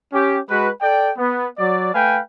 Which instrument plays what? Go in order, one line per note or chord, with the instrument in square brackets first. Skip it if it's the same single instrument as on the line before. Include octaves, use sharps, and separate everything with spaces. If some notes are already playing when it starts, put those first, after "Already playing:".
[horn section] C#4 G4
G#3 F#4 B4
A4 D5 G5
B3
F#3 D5
A3 B4 F5 G5 G#5